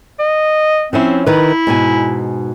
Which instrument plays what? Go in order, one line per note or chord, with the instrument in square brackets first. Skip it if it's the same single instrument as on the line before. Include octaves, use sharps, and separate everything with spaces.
[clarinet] D#5
[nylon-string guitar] F3 C#4 E4 [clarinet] C4
[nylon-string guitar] D#3 B4 [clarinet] E4
[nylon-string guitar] G#2 B2 G#5